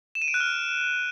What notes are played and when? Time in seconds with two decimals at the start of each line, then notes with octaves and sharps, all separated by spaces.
0.15 E7
0.22 D#7
0.28 D7
0.34 F#6
0.40 F6